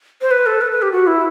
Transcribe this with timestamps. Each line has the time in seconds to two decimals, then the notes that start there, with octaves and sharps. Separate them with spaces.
0.21 C5
0.31 B4
0.46 A4
0.61 B4
0.72 B4
0.82 G4
0.92 F#4
1.07 E4